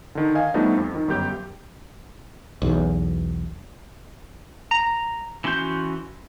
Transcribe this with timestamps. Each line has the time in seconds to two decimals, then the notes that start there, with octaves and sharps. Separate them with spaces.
0.15 D3 D#3
0.35 D#5 F5 G#5
0.54 F3 G3 A3 B3 D4 D#4
0.77 F2
0.95 D#3
1.08 G1 F#2 F#3 G4 G6
2.62 B1 E2
4.71 A#5
5.44 E3 C#4 F#4 C6 G6